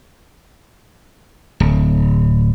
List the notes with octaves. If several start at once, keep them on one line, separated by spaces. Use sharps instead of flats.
D1